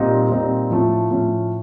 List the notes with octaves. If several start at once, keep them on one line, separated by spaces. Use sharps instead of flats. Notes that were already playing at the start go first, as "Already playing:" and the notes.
Already playing: A#2 G3 C4 D#4
A#2 G3 C4 D#4
A2 F3 A3 C#4
A2 F3 A3 C#4